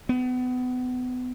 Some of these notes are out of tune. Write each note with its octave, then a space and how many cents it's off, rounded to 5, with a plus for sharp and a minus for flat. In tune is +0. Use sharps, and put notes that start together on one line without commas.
B3 +30